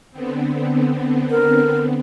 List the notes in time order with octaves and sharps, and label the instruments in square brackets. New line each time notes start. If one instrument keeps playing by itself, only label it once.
[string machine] D3 B3 C4
[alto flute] A#4